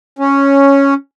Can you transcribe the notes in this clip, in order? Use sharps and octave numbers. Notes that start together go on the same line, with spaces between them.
C#4